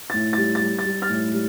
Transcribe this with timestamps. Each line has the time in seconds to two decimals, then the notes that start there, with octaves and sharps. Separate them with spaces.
0.10 A2 A6
0.33 G3 A6
0.55 A6
0.61 G3
0.79 A6
0.85 G3
1.02 F6 A6
1.10 A2
1.33 G3